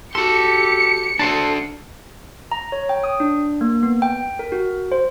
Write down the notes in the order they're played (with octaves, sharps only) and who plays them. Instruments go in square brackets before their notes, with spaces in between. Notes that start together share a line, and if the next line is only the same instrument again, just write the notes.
[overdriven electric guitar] F#4 C6 [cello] G4 [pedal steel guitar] A4 [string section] C#7
[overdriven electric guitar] D4 F#4 [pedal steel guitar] A4 C5 A5
[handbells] A#5
C#5
G5
D#6
D4
A#3
B3
G5
A#4
F#4
C5